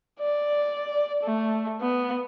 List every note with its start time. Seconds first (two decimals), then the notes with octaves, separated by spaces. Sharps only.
0.21 D5
1.24 A3
1.81 B3